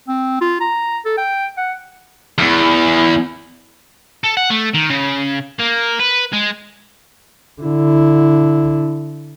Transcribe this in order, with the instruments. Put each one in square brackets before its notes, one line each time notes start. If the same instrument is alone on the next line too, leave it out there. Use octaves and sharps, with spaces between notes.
[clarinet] C4
F4
A#5
A4
G5
F#5
[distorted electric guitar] E2
A4
F#5
A3
D#3
C#3
A#3
B4
G#3
[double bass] D3 E4